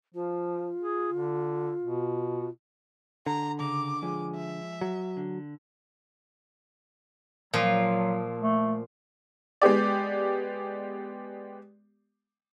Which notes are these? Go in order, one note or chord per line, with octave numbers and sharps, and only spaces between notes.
F3 F4
G#4
D3
B2
D3 A#5
C#3 A#5 D6
F3 G#3 G#4
E5
F#3
D3
A#2 F3 F#3
A3
G#3 B3 G4 D5